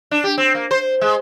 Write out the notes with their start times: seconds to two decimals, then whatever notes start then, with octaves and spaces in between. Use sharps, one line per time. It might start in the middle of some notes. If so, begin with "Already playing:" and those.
0.11 D4
0.24 G4
0.38 C4
0.55 A#3
0.71 C5
1.01 G#3